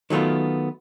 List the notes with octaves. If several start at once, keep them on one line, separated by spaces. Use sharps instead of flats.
D#3 F#3 A3 B3 F4